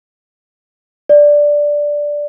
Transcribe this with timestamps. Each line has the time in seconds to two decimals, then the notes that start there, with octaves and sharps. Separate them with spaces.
1.09 D5